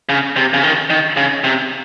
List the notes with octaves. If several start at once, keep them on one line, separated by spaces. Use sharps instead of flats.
C#3
C3
C#3
D#3
D#3
C#3
C3